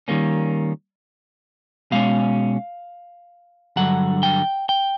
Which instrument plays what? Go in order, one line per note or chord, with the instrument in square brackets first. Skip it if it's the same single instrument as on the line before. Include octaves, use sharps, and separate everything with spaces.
[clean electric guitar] D#3 G3 A#3 C#4
B2 G#3 C#4 F5
G2 D3 F#3 F#5
G5
G5